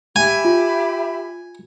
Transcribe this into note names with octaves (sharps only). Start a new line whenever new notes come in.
G4 E5 G#5 B5
F4